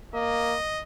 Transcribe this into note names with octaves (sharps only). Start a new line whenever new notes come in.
A#3 D#5